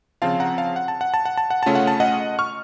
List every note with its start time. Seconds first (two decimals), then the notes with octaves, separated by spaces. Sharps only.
0.22 C#3 F3 C4 F4 F5 A5
0.40 F#5 A#5
0.58 F5 A5
0.76 F#5
0.88 A5
1.01 F#5
1.14 A5
1.25 F#5
1.37 A5
1.50 F#5
1.63 C#3 A3 C#4 F4 A5
1.75 F#5
1.87 A5
2.00 D#5 F#5
2.39 C#6 F6